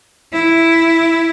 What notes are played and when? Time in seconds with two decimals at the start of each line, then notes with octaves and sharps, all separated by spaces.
0.33 E4